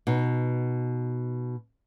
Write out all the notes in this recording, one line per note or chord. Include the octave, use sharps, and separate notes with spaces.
B2 D#4